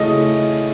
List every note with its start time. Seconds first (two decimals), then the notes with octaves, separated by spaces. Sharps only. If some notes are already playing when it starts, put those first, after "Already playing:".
Already playing: C#3 A3 E4 D#5